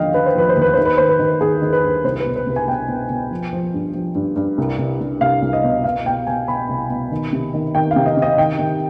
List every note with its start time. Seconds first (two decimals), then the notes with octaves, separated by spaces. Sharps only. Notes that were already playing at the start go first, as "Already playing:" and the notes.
Already playing: D#2 D3 F3 D#5 F5 G5
0.14 D3 B4
0.26 C5
0.35 F3 B4
0.49 C5
0.56 D#2
0.62 B4
0.73 D#3 C5
0.85 B4
0.97 D#3 C5
1.09 B4
1.19 D#3
1.41 D#3 G#4
1.62 D#3
1.73 B4
1.83 G2
2.04 C2 C5
2.20 B4
2.25 B2
2.36 B4
2.47 C2
2.56 G#5
2.67 B2 G5
2.88 B2
3.10 B2
3.31 F3
3.53 F3
3.74 G2
3.94 F3
4.15 G2
4.36 G2
4.58 C2
4.79 C2
5.00 C2
5.21 C2 F5
5.42 C2
5.53 D#5
5.64 B2
5.84 B2 F5
6.06 B2 G5
6.27 B2 G#5
6.48 B2 B5
6.69 C2
6.90 B2
7.11 D#3
7.33 C3
7.54 D#3
7.75 D#3 G5
7.91 F5
7.96 C3
8.06 D#5
8.17 C3
8.22 D#5
8.38 D#3 G5
8.59 D#3